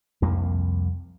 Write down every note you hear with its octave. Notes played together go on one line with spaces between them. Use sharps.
C2 F2 A#3